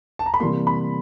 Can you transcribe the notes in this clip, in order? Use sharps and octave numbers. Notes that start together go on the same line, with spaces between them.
A5
A#5
B5
C3 E3 G3 A#3 C6
B5